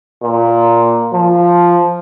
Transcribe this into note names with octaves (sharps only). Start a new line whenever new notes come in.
A#2
F3